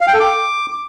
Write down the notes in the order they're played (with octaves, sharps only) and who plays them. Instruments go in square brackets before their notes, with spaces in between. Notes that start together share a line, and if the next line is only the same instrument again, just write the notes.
[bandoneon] F5
G5
A4
D6